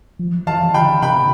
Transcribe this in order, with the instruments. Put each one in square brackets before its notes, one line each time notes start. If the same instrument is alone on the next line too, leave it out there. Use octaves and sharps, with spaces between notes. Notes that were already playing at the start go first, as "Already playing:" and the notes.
[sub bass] F3
[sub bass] E3 [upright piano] F5 A5
[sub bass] E3
[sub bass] D3 [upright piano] G5 B5
[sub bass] C3 [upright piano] G5 B5